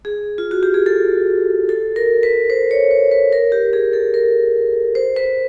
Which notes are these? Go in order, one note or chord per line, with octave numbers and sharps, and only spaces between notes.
G#4
F4
F#4
G4
G#4
A4
A4
A#4
B4
C5
C#5
C5
B4
A#4
G4
G#4
A4
A#4
C5
B4